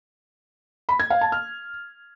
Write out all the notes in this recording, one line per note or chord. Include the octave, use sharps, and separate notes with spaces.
B5
G#6
F5
A5
F6